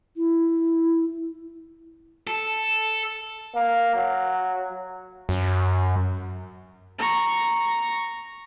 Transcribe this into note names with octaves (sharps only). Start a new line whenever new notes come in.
E4
A4
A#3
F#3
F#2
A#5 C#6